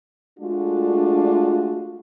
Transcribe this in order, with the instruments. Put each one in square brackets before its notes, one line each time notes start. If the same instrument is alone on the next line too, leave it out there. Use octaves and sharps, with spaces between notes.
[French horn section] G#3 A3 D4 F4 F#4